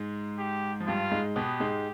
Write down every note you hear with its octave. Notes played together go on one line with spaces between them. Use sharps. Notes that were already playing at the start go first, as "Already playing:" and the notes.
Already playing: G#2 G#3
G4
F3
G2 G3 F4
G#2 G#3
B2 B3 G4
G#2 G#3